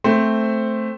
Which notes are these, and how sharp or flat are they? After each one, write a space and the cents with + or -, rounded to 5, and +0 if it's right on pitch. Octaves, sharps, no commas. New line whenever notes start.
A3 +0 C4 +0 C5 +0